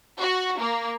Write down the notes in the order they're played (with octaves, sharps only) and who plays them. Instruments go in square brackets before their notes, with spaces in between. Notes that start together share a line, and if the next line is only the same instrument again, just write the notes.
[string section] F#4
A#3